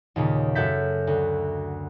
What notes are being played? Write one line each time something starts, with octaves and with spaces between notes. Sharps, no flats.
D#2 A#2 C#3
F#2 F#4 A4 E5 G6 B6
D2